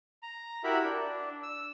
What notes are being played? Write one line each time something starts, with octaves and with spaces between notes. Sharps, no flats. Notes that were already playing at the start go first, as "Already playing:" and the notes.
A#5
E4 F#4 G4 A#4 E5 B5
D4
E6